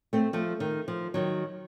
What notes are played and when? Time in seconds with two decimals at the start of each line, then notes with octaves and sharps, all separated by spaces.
0.13 A3 C4
0.33 F3 A3
0.60 D#3
0.88 F3
1.14 D#3 F#3